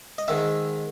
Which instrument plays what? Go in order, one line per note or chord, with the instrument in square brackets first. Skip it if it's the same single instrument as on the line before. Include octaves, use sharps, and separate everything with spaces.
[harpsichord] D#5
G#2 D#3 E5